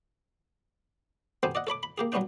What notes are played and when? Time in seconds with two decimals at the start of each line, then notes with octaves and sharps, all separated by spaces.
1.43 B3 C4 G4 A4 C5 G#5
1.55 D5 D#5 F#5
1.67 A4 C#5 B5 D6
1.83 B5
1.98 A#3 G4 G#4
2.12 F#3 G3 B3 C#4 D4 G5